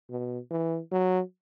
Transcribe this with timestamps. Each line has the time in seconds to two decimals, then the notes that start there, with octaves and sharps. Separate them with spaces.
0.10 B2
0.51 E3
0.92 F#3